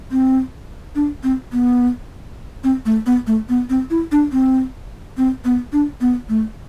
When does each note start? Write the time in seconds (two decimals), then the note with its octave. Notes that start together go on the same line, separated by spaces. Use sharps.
0.11 C4
0.95 D4
1.23 C4
1.53 B3
2.64 C4
2.86 A3
3.06 B3
3.27 A3
3.49 B3
3.70 C4
3.90 E4
4.12 D4
4.32 C4
5.18 C4
5.45 B3
5.73 D4
6.01 B3
6.29 A3